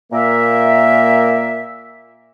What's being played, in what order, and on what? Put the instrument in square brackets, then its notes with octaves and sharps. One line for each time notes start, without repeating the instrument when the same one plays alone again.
[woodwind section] A#2 A#3 A#4 E5